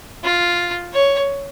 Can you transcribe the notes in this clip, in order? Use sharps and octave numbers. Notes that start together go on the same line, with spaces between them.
F4
C#5